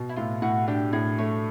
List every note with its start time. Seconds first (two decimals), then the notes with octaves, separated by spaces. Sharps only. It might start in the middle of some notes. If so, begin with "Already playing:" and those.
Already playing: B2
0.09 E4
0.16 A2 F4
0.42 A2 F#4
0.68 D4 G4
0.93 A2 G#4
1.18 A3 C#5